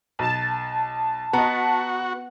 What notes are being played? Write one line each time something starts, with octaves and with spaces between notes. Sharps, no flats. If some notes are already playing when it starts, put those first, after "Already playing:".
B1 A5
B3 F#4 D#5 A#5